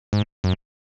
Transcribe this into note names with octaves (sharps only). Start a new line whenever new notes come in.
G#2
F#2